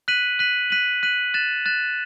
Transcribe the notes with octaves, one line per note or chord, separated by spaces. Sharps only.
F#6 B6 D#7 F#7
F#6 B6 D#7 F#7
F#6 B6 D#7 F#7
F#6 B6 D#7 F#7
F#6 A6 E7
F#6 A6 E7